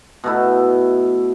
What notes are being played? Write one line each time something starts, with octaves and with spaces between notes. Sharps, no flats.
B2 A3 E4